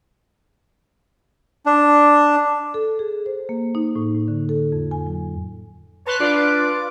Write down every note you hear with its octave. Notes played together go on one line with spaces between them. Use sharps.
D4
A4
G#4
C5
A#3
D#4
A2
A2
D3
A4
F2
G#5
F#3
B4 C#5 A5 C6 F#6
D4 F4 D5 D6